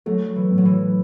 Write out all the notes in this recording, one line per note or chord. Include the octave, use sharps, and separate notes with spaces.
F#3 A3
E3
A2
F#3
E3